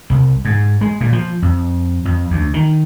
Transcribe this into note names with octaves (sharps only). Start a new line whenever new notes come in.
C2
G#2
G#3
A#2
F3
F2
F2
D2
D#3